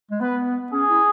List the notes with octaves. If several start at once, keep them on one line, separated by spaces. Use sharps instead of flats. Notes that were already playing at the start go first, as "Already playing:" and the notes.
G#3
B3 B4
C#4 G#4
E4